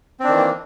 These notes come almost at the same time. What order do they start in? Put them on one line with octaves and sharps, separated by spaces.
C4 D4 D#3 E3 A#3